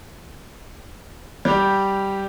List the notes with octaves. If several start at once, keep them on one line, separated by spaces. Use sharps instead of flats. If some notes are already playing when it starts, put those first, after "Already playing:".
G3 G4